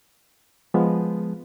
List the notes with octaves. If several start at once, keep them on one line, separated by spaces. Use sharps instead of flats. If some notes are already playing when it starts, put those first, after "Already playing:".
F3 G#3 B3